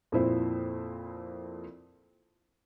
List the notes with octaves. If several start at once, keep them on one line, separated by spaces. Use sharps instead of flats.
F2 A#2 E4 C5